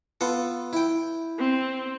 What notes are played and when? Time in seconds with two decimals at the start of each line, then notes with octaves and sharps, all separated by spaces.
0.21 B3 F4 A4
0.73 E4 G5
1.39 C4